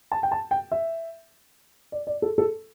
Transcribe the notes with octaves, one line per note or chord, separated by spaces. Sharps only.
A5
G5
A5
G5
E5
D5
D5
A4
A4